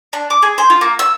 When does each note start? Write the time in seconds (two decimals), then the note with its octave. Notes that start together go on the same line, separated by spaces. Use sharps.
0.13 D4
0.30 D6
0.42 G#4
0.58 C5
0.70 F4
0.81 A#3
0.99 E6